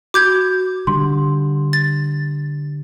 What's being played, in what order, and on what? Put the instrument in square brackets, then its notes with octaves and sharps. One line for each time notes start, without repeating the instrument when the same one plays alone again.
[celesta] F#4 [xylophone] D6 G6 G#6
[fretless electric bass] D3 G3 [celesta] C6
[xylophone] A6